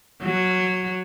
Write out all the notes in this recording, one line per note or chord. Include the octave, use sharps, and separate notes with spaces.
F#3